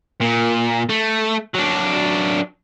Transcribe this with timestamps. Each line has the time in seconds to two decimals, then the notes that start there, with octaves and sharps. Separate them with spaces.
0.21 A#2
0.89 A3
1.55 F#3 D4